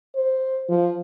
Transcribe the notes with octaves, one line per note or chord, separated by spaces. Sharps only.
C5
F3